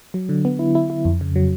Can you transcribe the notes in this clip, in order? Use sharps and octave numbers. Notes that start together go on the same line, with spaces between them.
F#3
D3
B3
E4
E4
E4
F2
C#3
F#3